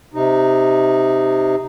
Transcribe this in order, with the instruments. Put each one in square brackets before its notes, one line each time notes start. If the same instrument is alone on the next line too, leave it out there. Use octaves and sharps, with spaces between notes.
[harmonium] C3 D#4